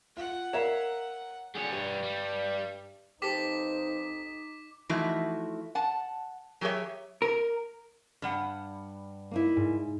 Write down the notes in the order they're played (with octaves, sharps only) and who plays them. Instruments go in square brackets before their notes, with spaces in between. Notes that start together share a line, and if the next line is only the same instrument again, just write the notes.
[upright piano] F4 [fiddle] F#5
[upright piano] A#4 A#5 E7 [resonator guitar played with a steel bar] C#5 E5 F5
[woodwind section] D3 F#4 G#4 [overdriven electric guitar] G3 C#5
[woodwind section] G2
[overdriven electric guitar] G3
[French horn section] F2 B4 C5 [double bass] D#4 [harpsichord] G4 A4 [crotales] D6 B6
[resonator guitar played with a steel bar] E3 F3 A3 D#4 E4 F#4
F#5 A5
F#3 G4 G#4 B4 C#5 E5
[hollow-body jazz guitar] A#4
[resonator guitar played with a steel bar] G2 G3 F#5
[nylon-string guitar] A#3 D#4 E4
[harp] G#2